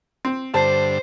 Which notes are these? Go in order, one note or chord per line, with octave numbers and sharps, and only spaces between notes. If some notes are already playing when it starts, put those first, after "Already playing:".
C4
G2 D3 C5 A5